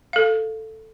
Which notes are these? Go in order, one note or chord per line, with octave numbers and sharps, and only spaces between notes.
A4 F5